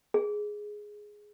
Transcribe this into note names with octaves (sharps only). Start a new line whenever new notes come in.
G#4